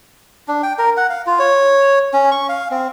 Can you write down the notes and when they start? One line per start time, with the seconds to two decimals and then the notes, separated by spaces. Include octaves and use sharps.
0.48 D4
0.63 G5
0.79 A#4
0.97 F#5
1.10 F5
1.27 F4
1.39 C#5
2.13 C#4
2.31 C#6
2.49 F5
2.71 C4